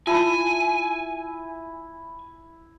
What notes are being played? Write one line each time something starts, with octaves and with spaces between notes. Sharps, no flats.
E4 F4 G#5 A5